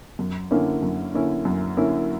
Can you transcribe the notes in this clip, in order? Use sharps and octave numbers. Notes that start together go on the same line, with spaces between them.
F#2
D3 A#3 C#4 E4
F#2
D3 A#3 C#4 E4
F#2
D3 A#3 C#4 E4